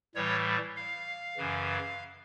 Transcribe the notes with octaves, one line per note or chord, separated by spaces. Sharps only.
A2 E3 G3 C#5
F5
F#2 C#3 E3